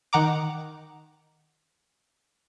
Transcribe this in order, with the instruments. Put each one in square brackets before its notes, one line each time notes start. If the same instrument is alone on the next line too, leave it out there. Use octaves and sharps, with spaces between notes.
[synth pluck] D#3 F#5 A#5 D6